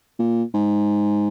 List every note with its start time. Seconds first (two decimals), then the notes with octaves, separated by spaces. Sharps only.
0.19 A#2
0.54 G#2